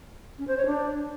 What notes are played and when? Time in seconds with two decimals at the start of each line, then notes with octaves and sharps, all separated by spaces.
0.38 C#4
0.47 C5
0.57 C#5
0.66 D4